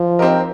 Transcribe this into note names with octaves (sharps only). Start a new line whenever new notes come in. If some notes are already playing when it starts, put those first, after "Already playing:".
Already playing: F3
C4 D#4 G4 A#4 D#5